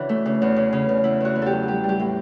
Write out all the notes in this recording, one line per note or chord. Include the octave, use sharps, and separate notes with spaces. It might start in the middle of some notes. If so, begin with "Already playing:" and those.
Already playing: C#3 E3 D4 F#4
A3
C#3
E2
C#3
C#3
E2
E2 E4
E2 F#4
E2
G4 A4
F#3
G3 G4
G3
G4
A2